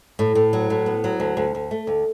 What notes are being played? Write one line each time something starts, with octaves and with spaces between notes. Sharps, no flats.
A2
A2
F#3
A2
B3
F#3
D2
D2
D2
A3
D2